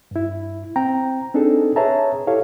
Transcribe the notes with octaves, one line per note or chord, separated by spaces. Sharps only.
G2 E4
C4 G5 A#5
C4 D4 D#4 G#4 A4
G#4 B4 C#5 E5 A5 A#5
E4 G4 A4 C#5 F5